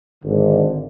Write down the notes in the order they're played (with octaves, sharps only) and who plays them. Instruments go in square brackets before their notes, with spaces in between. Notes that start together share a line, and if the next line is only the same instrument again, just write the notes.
[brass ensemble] G#1 D3